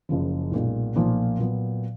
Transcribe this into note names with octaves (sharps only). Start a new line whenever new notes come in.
F#1 F#2 C#3 F3
B1 A#2 G#3
B1 A#2 F3 A#3
A#2 F#3 B3